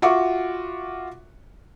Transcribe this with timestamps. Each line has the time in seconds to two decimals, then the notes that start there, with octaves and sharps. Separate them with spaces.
0.02 F4 F#4 E5 C#6 D6